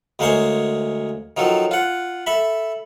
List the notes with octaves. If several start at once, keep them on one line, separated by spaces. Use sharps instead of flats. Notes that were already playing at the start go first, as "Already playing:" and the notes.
D2 G#3 A#3 C5 C#5 G#5
D#3 F3 F#3 A4
F4 F#5
A4 E5 B5